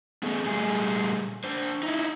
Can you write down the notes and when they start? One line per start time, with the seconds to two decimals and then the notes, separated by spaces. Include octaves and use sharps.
0.23 B3 G#4 A4
0.45 A#2 G3 A3 G#4
1.44 D4 C5
1.83 D#4 E4